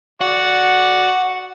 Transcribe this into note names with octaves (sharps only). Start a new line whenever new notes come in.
F#4 D5 F#5